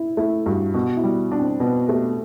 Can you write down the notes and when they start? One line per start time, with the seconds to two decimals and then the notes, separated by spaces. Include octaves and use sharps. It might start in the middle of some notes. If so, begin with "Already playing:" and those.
Already playing: E4
0.17 A3 E4
0.46 G2 F#4
0.74 B2 F#4
0.97 E4
1.04 G3
1.32 D4
1.39 C4
1.60 B2 B3
1.89 A3 G4